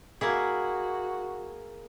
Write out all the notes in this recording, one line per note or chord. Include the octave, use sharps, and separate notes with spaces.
A#3 E4 F#4 G#4